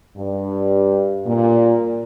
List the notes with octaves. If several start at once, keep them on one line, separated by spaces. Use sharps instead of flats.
G2
A#2